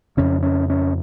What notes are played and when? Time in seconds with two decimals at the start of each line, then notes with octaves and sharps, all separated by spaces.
0.17 F2 C#3 C#4
0.43 C#4
0.70 C#4